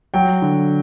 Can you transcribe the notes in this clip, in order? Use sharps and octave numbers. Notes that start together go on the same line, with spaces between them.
F#3 G5
D3